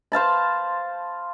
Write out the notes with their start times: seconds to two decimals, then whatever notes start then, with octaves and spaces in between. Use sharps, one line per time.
0.12 C5 F5 A5 B5